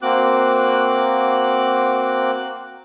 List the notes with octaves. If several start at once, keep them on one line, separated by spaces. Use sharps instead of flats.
A#3 C4 F#4 D6 F#6